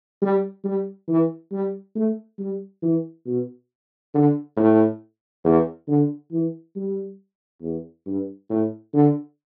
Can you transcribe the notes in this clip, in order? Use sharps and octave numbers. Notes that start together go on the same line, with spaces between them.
G3
G3
E3
G3
A3
G3
E3
B2
D3
A2
E2
D3
E3
G3
E2
G2
A2
D3